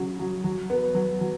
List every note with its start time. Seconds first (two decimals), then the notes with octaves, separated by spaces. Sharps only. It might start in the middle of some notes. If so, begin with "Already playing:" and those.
Already playing: C#3 F#3
0.19 F#3
0.44 F#3
0.70 B3
0.95 F#3
1.21 F#3